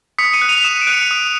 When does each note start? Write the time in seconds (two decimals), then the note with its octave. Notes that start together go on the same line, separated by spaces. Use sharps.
0.18 D#6 B6 C#7
0.34 C#7 D#7
0.42 F#6
0.49 D#7 F7
0.64 D#6 E7
0.73 D#7
0.82 D7
0.87 F#6 C#7 D#7
1.11 D#6